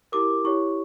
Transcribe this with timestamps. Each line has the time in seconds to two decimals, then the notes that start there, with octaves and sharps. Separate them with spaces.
0.12 E4 G4 A#4 D6
0.44 E4 G4 C#5 C#6